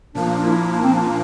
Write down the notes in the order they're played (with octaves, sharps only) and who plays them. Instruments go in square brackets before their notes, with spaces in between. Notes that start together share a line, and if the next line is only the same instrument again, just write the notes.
[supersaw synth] A#2 F3 A#3 [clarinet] D4
[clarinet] D4
E4
D4
C4
D4
D4